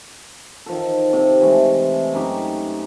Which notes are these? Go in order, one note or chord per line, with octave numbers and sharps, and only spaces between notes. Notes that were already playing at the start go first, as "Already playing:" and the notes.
D#3 F3 A4
C3 A4
E3 G#3 A3
F#2 D#4 G4